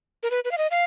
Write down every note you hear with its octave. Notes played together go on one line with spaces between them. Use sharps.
A#4
B4
B4
F5
D#5
F5